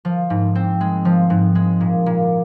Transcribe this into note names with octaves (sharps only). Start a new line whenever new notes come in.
F3
G#2
C4
G#3
F3
G#2
G#3
A#2
A#2